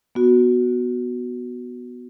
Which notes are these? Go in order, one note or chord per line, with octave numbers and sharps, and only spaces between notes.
B3 F#4